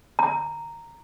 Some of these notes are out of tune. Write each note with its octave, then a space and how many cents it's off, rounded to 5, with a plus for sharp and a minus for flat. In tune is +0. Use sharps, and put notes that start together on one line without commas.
A#5 -10